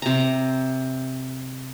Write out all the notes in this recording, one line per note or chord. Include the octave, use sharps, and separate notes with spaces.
C3 A#5